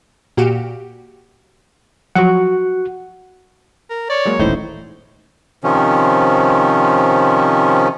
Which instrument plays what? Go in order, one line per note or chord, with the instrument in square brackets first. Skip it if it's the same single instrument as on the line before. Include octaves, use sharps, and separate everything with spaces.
[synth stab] A#2 F#4 G4
[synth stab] F3 F#3 [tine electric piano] F#4 F#5
[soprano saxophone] A#4
[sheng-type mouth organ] C#5 [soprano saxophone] D5
[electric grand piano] F#3 G#3 A#3
[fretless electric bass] D#1 A1 A2 [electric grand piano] D#4 E4 [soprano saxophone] C5
[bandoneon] C3 D#3 F3 C#4